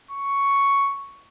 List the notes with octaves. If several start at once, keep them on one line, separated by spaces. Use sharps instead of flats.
C#6